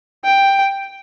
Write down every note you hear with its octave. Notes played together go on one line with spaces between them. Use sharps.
G5